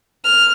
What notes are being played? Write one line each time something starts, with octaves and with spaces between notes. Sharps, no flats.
F6